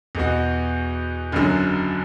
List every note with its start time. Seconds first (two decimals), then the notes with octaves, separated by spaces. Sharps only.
0.15 E2 B2 B3 F#4
1.32 F#1 F#2 D3 F#3